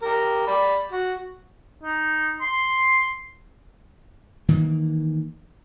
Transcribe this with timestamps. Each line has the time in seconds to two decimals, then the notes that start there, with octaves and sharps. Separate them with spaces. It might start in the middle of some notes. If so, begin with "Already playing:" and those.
0.02 G4 A#4
0.47 D5 B5
0.92 F#4
1.83 D#4
2.41 C6
4.49 D#3 E3 A#3